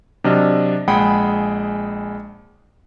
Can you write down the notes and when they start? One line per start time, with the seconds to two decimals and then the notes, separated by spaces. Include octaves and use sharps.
0.24 C3 F#3 D4 D#5 F6
0.88 A#1 G#3 G#4 F#5 G5 B5